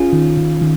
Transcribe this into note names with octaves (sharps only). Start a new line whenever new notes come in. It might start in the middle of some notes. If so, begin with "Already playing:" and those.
Already playing: C#4 F4 G#4
D#3
D#3
D#3